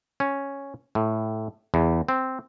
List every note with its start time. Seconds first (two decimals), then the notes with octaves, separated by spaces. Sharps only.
0.20 C#4
0.95 A2
1.74 E2
2.09 C4